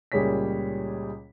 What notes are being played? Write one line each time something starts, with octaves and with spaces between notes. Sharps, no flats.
C#2 A#2 G3 G#4 C#5 B6